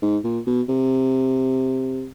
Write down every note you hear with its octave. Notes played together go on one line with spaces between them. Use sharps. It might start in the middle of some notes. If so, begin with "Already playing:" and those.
G#2
A#2
B2
C3